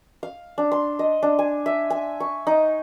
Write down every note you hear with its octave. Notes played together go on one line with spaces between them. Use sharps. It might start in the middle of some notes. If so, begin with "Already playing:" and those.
F5
D4
C6
D#5
D4
G#5
E5
G#5
C#6
D#4